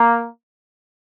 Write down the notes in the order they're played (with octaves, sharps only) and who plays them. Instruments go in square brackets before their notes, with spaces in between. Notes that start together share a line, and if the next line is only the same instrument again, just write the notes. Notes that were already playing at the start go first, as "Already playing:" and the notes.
Already playing: [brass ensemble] A#3